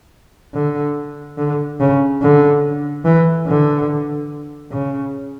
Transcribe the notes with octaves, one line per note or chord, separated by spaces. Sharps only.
D3
D3
C#3
D3
E3
D3
C#3